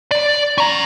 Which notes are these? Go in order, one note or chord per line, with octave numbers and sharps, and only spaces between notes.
D5
C#4 A#5